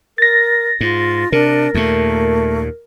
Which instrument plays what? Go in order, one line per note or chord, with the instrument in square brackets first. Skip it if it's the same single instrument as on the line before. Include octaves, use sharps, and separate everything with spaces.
[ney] A#4 [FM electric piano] A6 A#6
[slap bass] G#2 [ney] F4
[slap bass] C3 [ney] D4 [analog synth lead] A#4
[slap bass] D#2 A#2 [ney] A3